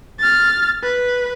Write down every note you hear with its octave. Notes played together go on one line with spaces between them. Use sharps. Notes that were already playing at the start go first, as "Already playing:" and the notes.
F6 A6
B4